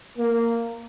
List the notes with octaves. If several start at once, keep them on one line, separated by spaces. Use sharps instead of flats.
A#3